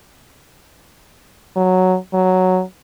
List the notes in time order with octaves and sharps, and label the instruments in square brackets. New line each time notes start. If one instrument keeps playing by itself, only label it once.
[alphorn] F#3
F#3